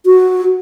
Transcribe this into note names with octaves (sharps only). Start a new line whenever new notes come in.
F#4